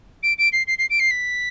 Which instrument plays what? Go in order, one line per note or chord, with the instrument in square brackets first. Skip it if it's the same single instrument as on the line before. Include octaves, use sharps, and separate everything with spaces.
[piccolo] D7
D7
C7
C7
C7
D7
C7
B6